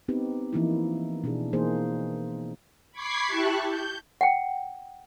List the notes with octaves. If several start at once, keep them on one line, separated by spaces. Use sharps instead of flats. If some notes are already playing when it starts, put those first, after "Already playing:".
B3 C4 D#4 G4 B4
E3 F3 A#3 D#4 E4
B2 D4 G#4
E3 A#3 D#4 G#4 C5
B5 C#6 D6 G#6 B6 C7
E4 G4 A5 C#6 F#6
G6
F#5 G5